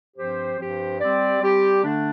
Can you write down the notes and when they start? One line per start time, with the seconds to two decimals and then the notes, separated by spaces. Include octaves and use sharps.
0.17 G2 F3 C4 G4 C5
0.58 G2 F3 C4 G4 C5
1.00 G3 C4 G4 D5
1.40 G3 C4 G4 D5
1.83 D3 A3 D4